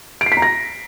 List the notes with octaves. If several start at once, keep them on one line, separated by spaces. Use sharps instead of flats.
D7
C7
B6
A#5
A#6